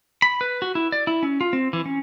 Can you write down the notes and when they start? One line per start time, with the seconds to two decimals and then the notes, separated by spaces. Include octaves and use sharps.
0.22 B5
0.41 B4
0.62 F#4
0.75 E4
0.92 D5
1.07 E4
1.23 C#4
1.41 F4
1.53 C4
1.73 E3
1.86 C#4